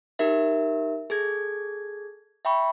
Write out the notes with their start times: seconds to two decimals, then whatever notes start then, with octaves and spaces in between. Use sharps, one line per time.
0.19 D#4 G4 A#4 E5
1.10 G#4 A4 G#6
2.45 E5 G5 B5 C#6